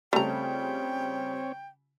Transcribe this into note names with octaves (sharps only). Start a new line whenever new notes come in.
C#3 G3 A3 C4 F4 C#5 G5 A#5